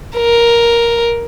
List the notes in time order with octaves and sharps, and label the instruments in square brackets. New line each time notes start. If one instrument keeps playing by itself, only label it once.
[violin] A#4